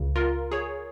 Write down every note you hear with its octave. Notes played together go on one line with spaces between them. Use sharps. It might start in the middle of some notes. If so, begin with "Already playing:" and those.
Already playing: C#2 C#3
F4 A#4
G#4 C#5